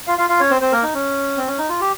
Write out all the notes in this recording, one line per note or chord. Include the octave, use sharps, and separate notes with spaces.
F4 F5
F4 F5
F4 F5
C#4 C#5
C4 C5
C4 C5
A#3 A#4
D#4
C#4
C4
C#4
D#4
F4
G4